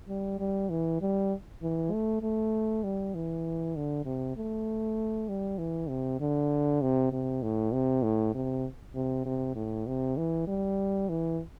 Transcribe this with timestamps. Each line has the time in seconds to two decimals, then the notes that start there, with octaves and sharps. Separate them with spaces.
0.08 G3
0.39 G3
0.69 E3
1.01 G3
1.62 E3
1.92 A3
2.22 A3
2.84 G3
3.15 E3
3.76 D3
4.05 C3
4.36 A3
5.29 G3
5.58 E3
5.89 C3
6.20 D3
6.81 C3
7.12 C3
7.42 A2
7.73 C3
8.03 A2
8.34 C3
8.95 C3
9.25 C3
9.55 A2
9.87 C3
10.17 E3
10.47 G3
11.09 E3